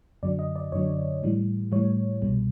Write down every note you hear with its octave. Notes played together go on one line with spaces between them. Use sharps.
F#2 D3 F#3 D5
D#5
D5
F#2 D3 F#3 C#5
A2 E3 G3
A2 E3 G3 C#5
C2 B2 G3